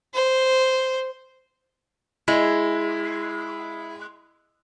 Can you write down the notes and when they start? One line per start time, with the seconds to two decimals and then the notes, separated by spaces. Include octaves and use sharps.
0.14 C5
2.28 G#3 E4